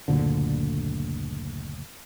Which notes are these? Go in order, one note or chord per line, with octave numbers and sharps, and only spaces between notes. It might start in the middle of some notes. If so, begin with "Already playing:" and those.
F#1 D2 A#2 D3